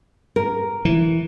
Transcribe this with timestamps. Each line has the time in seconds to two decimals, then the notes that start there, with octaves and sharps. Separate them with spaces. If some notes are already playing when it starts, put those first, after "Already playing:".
0.36 A#4
0.85 E3